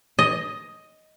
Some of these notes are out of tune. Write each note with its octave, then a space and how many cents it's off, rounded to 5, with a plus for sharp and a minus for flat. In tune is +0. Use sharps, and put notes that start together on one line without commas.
D#5 +5